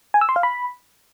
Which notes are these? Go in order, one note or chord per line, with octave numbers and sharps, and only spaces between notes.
G#5
E6
C6
F5
B5